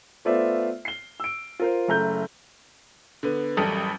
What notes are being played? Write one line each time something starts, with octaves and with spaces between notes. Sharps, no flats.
A3 B3 F4 C5 D5 E5
C7 G7
E6 D7
F4 A#4 C5
F#1 A3 A#5 G6
D3 B3
A1 F#2 G3 A4 D#6